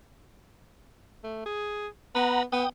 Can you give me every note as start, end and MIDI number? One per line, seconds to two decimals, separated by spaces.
1.24 1.41 57
1.46 1.87 68
2.15 2.43 59
2.15 2.43 78
2.15 2.43 82
2.15 2.43 83
2.52 2.65 59
2.52 2.69 79
2.52 2.69 87